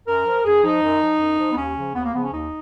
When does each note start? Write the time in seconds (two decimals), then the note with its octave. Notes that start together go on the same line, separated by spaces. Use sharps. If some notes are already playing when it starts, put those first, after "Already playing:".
0.07 F#2 A#4
0.26 F3
0.44 F#2 G#4
0.63 F3 D#4
0.82 F#2
1.01 F3
1.20 F#2
1.39 F3
1.52 B3
1.57 D#2 C#4
1.76 C#3 F3
1.94 D#2 B3
2.04 A#3
2.14 C#3 F3 B3
2.23 C#4
2.32 D#2 D#4